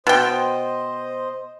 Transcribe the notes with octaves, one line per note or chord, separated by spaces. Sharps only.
B2 C5 D#5 G5